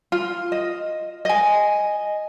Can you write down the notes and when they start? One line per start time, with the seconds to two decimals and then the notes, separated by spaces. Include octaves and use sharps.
0.12 F4
0.52 D#5
1.25 D#5 G#5